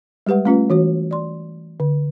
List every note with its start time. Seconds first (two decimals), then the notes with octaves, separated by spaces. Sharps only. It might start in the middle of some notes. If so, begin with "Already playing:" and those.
0.26 G3 G#3 G4 B4 F#5
0.45 A3 C#4 F4 B4
0.70 E3 F#4 C#5
1.11 D5 C6
1.80 D3